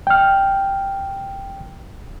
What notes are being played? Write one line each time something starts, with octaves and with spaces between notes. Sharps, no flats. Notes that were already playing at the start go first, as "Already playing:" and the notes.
G5 F6